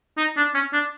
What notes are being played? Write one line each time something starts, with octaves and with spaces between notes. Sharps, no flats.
D#4
D4
C#4
D4